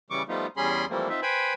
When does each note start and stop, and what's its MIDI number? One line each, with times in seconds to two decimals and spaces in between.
0.10 0.23 49
0.10 0.23 52
0.10 0.23 55
0.10 0.23 85
0.10 0.23 86
0.29 0.47 53
0.29 0.47 55
0.29 0.47 57
0.29 0.47 59
0.29 0.47 63
0.29 0.47 65
0.57 0.85 40
0.57 0.85 55
0.57 0.85 61
0.57 0.85 68
0.57 0.85 83
0.57 0.85 84
0.90 1.09 52
0.90 1.09 53
0.90 1.09 55
0.90 1.09 57
0.90 1.09 58
0.90 1.09 60
1.09 1.21 60
1.09 1.21 63
1.09 1.21 65
1.09 1.21 76
1.22 1.54 71
1.22 1.54 72
1.22 1.54 79
1.22 1.54 80
1.22 1.54 83